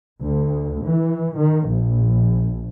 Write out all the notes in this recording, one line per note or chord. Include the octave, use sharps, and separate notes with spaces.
D2
E3
D#3
A#1